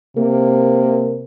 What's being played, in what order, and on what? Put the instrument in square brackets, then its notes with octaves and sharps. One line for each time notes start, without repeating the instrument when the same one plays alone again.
[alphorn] C3 [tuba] A#3